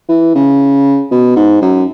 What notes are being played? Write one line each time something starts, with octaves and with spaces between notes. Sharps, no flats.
E3
C#3
B2
G#2
F#2